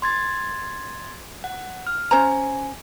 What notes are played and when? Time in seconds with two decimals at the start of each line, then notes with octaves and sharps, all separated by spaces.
0.02 C6 G#6 A6
1.44 F#5
1.87 F6
2.11 C#4 C5 G#5 A#5